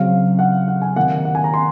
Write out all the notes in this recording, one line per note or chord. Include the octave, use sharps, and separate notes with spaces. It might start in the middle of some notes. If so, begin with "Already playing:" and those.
Already playing: C#3 F#3 C4 F5
F#5
F#5
G#5
C3 D#3 A#3 F#5
F#5
G#5
A#5
C6